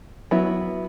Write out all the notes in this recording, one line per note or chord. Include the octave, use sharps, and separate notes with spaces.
F#3 B3 E4